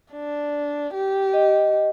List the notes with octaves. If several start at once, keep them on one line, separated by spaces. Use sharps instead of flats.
D4
G4
D#5